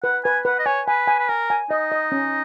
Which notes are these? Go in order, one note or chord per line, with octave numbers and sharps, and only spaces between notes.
B4 F#5
B4 G#5
B4 F#5
D#5
C#5 G#5
B4 G#5
G#5
B4
A#4 G#5
G#5
D#4 D#5
D#5
C#4